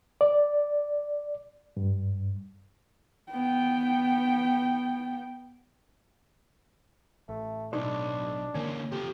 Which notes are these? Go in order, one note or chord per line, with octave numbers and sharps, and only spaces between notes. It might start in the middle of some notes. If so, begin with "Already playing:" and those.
D5
G2
B3 G5
A1 A3
B1 D4 D#4 C5
C#2 D3 E3 A#3 C#4
F2 C3 G4 A4